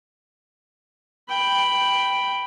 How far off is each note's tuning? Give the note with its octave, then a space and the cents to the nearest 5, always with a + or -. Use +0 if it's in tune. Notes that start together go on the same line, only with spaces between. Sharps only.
G5 +0 B5 +0